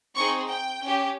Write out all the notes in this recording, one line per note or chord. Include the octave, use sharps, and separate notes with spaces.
C4 D#4 G#4 C#6
G5
C#4 G4